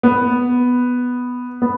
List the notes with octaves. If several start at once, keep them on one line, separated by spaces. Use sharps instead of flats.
B3
B3